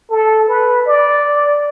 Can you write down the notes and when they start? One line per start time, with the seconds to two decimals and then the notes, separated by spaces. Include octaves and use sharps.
0.11 A4
0.48 B4
0.87 D5